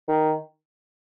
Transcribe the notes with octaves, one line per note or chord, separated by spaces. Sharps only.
D#3